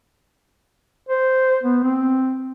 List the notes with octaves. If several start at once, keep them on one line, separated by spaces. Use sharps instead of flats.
C5
B3
C4